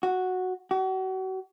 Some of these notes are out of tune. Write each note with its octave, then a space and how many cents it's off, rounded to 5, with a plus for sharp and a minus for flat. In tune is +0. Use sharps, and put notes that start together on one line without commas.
F#4 -5
F#4 +35